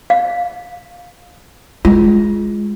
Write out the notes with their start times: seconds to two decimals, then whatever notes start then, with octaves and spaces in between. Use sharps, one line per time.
0.10 F5
1.85 G#3 F4